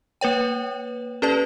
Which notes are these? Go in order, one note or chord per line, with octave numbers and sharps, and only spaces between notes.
A#3 B4 C#5 G5
C#4 G4 A4 B4 D5 A5